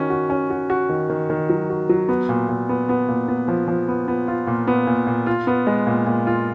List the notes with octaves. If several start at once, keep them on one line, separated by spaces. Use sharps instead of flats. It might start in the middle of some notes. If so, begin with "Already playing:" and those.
Already playing: D#3 C#4 F#4
F#4
C#4
F#4
F#4
D#3
D#3
D#3
F#3
F#4
F#3
B3
A#2
A#2
B3
B3
A#2
B3
F3
F3
B3
B3
F4
A#2
B3
A#2
A#2
F4
B3
G#3
A#2
A#2
F4